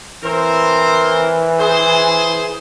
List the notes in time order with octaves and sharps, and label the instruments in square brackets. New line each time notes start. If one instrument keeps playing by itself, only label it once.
[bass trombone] E3 [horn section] C4 A#4 C5
[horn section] G#4 C5